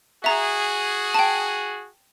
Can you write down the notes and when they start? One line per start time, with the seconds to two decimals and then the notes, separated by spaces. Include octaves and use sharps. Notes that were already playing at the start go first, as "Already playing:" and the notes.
0.24 F#4 G#4 E5 A#5
1.14 G5 A5